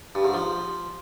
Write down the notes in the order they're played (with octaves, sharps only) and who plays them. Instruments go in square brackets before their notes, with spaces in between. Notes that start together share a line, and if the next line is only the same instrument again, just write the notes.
[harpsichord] G2
G#2
F3